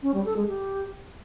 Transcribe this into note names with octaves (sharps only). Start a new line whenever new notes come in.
C#4
G3
A4
G#3
G4